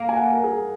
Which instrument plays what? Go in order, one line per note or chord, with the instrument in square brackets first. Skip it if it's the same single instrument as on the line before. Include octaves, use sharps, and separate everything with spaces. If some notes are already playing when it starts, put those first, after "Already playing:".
Already playing: [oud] A#3 [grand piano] A#5
[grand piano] G#5
F#5
A#4
G#4